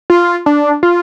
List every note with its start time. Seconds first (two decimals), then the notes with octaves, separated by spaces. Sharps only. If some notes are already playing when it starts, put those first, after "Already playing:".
0.10 F4
0.46 D4
0.83 F4